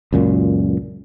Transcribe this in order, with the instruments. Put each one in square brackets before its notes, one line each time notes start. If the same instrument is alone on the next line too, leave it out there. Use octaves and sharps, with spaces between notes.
[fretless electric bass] C#2 F#2 A#2